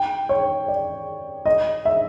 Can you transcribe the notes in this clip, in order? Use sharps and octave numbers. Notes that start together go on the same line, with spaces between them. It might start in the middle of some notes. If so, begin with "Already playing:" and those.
Already playing: G5
C#5
D5
D#5
E5